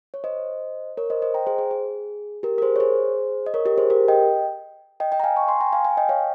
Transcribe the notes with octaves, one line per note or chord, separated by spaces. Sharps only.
C#5
C5 D#5
A#4 C#5
C5 D#5
C5 D#5
G5 A#5
G#4 C5
G#4
G#4
G4 A#4
A#4
G#4 C5
C#5
G#4 C5
D#5
A#4 C#5
G4 A#4
G#4 C5
G4 A#4
D#5 G5
D#5 G5
D#5 G5
A#5
F5 G#5
A#5 C#6
G#5 C6
G5 A#5
F5 G#5
F5 G#5
D#5 G5
C#5 F5